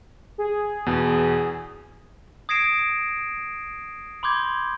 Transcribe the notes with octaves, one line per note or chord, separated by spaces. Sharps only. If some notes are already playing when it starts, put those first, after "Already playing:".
G#4
E2 B2
D#6 G#6 A#6 C7 D7 E7
B5 C6 D6 G6 G#6